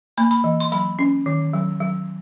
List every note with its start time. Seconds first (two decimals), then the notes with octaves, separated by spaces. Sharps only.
0.17 A#3 B5
0.31 B5
0.44 E3
0.60 C6
0.72 F#3 B5
0.99 C#4
1.26 D#3
1.54 F#3
1.80 F#3